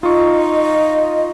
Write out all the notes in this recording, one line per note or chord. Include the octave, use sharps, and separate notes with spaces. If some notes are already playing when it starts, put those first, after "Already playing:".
D#4 F4 D#5 C#6